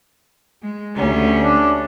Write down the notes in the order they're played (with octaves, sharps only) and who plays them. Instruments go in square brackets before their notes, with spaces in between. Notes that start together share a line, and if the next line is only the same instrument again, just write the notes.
[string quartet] G#3
D2 G3 C#4
[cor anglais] D4